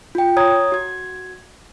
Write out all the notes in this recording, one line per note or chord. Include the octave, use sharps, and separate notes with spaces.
F4 G5
C#5 A#5 D#6 G#6
F#4 G#6